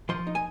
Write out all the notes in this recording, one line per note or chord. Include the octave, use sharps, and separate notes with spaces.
F3 C6
D#4
G#5